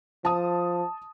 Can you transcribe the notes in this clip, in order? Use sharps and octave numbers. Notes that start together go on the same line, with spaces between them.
F3 A5 D#6